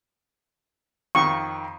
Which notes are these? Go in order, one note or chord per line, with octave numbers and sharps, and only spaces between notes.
F2 D#3 C#6